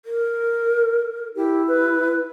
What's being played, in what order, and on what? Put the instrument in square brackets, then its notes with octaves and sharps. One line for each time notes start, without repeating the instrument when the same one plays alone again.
[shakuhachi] A#4
[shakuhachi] E4 [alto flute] G4
[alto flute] B4